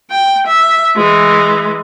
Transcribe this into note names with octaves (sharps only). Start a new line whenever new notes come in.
G5
E5
E3 G#3